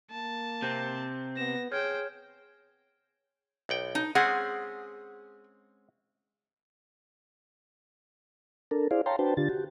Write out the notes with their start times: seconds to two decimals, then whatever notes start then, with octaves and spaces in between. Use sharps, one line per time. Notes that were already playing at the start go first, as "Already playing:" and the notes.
0.11 A#3 A5
0.62 C3 C4 G6
1.37 B3 A#6 E7
1.71 G#4 C5 C#5 G5 F6 G#6
3.69 B1 F#5 G5
3.95 D#4
4.15 G#3 C4 C#4 G#4 F#5
8.71 D4 A4 A#4
8.91 E4 G#4 C5 D5 F5
9.06 C#5 F5 G5 A5 A#5 C6
9.19 D4 F#4 B4 C5 G5 A5
9.37 D3 D4 F4 G4 A6
9.49 F#4 G4